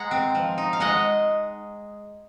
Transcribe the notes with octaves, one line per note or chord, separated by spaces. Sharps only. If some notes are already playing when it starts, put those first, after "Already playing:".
Already playing: G#3 F#5 A#5
C4
F3
D#4
F5
G#3 D#5 F#5